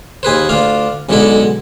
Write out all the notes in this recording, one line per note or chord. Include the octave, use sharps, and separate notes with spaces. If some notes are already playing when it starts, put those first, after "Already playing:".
D#2 G#4 B4 C5
D2 D4 F4 F5
B1 B2 D3 G#3 E4 A4